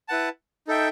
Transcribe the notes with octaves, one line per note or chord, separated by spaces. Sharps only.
E4 B4 F#5 A5
D#4 A4 E5 G5